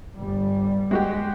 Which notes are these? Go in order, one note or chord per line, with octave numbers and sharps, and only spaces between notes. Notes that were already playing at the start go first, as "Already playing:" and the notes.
G1 G3
G#3 F#4 G4